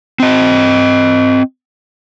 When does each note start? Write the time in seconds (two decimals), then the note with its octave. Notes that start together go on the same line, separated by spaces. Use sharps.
0.20 C4 D#5